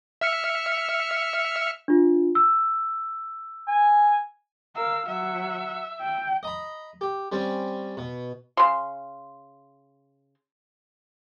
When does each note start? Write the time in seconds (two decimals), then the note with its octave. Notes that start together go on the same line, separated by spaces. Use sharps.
0.21 E5 F6 C#7
1.88 D4 F4
2.35 E6
3.68 G#5
4.75 A#4 F5 E6
5.08 F#3 E5 F#5
6.01 G5
6.43 D#5 A#5 B5
7.01 G4
7.32 G3 C4 C#4
7.97 B2
8.57 C#3 C6